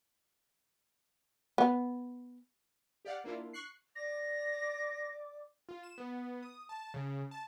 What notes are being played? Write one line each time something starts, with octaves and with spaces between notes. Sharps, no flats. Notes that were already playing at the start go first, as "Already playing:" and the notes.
B3
G4 D5 F5 F#5
A#3 D4 E4 F4
C#6 F#6 C7
D5 D6 A#6
F4
E7
B3
D#6
A5
C#3
A5